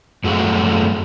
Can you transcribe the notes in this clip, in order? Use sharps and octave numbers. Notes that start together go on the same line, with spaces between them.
F#2 A3 F#4 G#4 F5